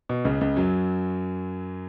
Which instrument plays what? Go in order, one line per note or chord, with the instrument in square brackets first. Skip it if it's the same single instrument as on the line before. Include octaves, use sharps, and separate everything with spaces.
[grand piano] B2
C#2 C#3
C#2 C#3
F#2 F#3